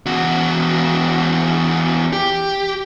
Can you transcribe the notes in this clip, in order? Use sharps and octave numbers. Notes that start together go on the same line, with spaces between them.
E2 F#4
G4